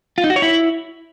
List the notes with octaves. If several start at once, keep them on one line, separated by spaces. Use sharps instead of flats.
F4
D#4
F#4
C#5
E4